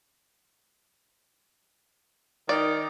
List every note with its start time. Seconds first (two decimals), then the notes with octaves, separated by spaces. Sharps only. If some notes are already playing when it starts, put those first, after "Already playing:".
2.49 D#3 D5